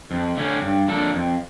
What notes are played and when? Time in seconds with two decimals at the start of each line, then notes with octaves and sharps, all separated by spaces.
0.11 F2
0.37 D3 A3 C#4
0.62 G2
0.88 F3 A#3 D4 A4
1.14 F2